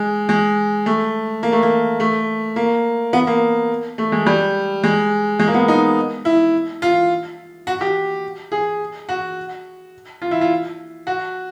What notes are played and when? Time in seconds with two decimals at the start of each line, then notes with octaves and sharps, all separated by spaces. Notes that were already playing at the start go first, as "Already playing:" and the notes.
Already playing: G#3
0.29 G#3
0.86 A3
1.43 A#3
1.52 A3
1.63 A#3
2.00 A3
2.56 A#3
3.13 B3
3.27 A#3
3.98 A3
4.12 G#3
4.26 G3
4.84 G#3
5.39 G#3
5.48 A#3
5.54 B3
5.68 D#4
6.25 E4
6.82 F4
7.67 F#4
7.81 G4
8.52 G#4
9.09 F#4
10.22 F4
10.31 E4
10.41 F4
11.07 F#4